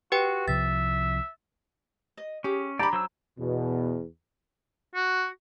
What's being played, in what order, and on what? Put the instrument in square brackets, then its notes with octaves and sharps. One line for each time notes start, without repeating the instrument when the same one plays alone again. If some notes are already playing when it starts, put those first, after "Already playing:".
[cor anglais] F#4 [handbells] G4 B4 G5
[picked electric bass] C2 C3 F3 [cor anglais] E5 [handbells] A6
[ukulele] D#5
[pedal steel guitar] C#4 [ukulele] G4 G#4
[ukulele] D4 B5 [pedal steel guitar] G4 D5 [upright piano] A#5
[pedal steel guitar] F#3 C5 E6
[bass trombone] E2 [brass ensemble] B2
[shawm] F#4